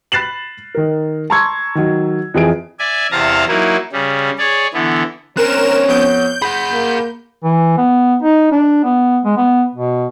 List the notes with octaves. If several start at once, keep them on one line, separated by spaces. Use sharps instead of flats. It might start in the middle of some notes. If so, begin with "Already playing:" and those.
B5 F#6 A6 C7 E7 F#7
D#3 A#4
A5 A#5 C6 C#6 E6 G#6
D#3 F#3
F2 E3 G#4 D7
D5 E5 G#5
E2 C3 F5 A5 A#5
F#3 A#3 D#4 E4
C#3 G3
G#4 C#5 D5
D3 E3 B3
C4 C#4 A#4 C#5 F#6 E7
F2 B3 G6 D7
G#4 F#5 B5
A#3
E3
B3
D#4
D4
B3
G#3
B3
B2